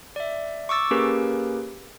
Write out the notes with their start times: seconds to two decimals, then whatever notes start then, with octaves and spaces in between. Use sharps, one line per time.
0.16 D5 E5
0.69 C#6 D6 E6 A6
0.91 A#3 C#4 G4 G#4 A#4 B4